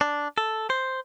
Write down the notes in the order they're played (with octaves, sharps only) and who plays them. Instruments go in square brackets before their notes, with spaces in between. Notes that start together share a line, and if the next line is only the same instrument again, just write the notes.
[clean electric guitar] D4
A4
C5